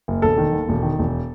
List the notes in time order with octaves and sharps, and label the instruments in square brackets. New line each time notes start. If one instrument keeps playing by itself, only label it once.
[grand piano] F#1
E1 A4
D#3
D#2
E1
D#3
E1